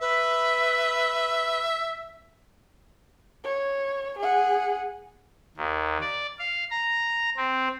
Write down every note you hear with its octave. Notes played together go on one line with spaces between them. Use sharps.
B4 E5
C#5
G#4 F#5
D#2
D5
F5
A#5
C4